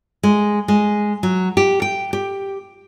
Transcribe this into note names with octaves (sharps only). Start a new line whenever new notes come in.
G#3
G#3
F#3
G4
G5
G4